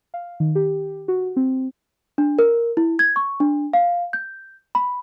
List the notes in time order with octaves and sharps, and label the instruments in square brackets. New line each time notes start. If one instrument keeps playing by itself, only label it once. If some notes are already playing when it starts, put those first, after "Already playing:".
[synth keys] F5
D#3
G4
F#4
C4
[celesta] D4
A#4
E4
G#6
C#6
D4
F5
G6
B5